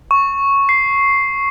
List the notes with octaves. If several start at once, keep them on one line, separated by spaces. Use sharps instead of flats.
C#6
C7